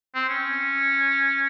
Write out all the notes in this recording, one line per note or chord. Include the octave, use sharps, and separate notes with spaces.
C4
C#4